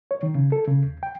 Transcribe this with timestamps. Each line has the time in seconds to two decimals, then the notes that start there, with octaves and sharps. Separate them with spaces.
0.11 C#5
0.23 D#3
0.35 C#3
0.52 A4
0.68 C#3
0.84 D#2
1.03 G5